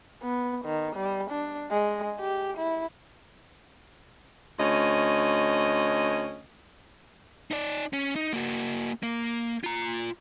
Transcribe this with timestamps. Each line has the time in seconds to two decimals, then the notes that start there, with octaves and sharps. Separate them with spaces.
0.23 B3
0.65 D#3
0.96 G3
1.31 D4
1.71 G#3
2.20 G4
2.58 E4
4.59 D2 C#4 D#5
7.51 D#4 D5
7.93 C#4
8.16 D#4
8.33 A#3 F#4
9.03 A#3
9.64 F4 A#5